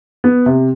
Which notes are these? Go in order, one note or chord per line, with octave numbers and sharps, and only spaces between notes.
B3
C3